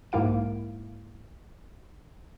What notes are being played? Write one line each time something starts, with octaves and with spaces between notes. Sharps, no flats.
B1 G#2 A#3 E4 F5 D7